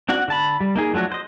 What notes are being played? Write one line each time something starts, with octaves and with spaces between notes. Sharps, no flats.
C4 D4 F#4 F#5
D3 A5 B5
G3
A#3 D#4 G#4
F3 F#3 A3 D4 F#4
C5 D#5